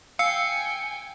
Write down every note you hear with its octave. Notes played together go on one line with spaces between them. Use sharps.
F5 G5 G#5 E6 C#7